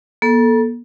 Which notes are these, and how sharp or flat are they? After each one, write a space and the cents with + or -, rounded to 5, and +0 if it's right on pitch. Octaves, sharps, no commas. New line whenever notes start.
A#3 +45 A4 +0